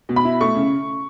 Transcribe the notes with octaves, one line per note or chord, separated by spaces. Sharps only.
B2
B5
E4
A3 C#6
C#3